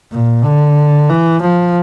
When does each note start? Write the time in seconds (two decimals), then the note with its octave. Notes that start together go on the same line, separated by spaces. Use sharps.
0.12 A#2
0.44 D3
1.09 E3
1.42 F3